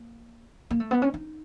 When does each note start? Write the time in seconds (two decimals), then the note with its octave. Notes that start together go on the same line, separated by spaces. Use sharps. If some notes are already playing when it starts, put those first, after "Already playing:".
Already playing: A#3
0.71 A#3
0.80 A3
0.91 B3
1.02 C#4
1.14 D#4